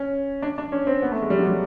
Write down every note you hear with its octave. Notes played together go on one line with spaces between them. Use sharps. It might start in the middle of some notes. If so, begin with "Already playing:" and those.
Already playing: C#4
D4
D4
C#4
C4
B3
A3
G#3
G3
F#3
G3